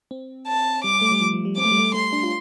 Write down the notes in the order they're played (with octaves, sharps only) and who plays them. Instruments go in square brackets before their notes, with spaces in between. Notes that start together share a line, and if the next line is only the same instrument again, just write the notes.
[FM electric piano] C4
[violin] A5
[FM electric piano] G3 [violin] D6
[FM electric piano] A3
G3
F3
F3
G3
[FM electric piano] C4 [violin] D6
[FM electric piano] A3
G3
A3
[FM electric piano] A3 [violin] C6
[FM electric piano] D4
F4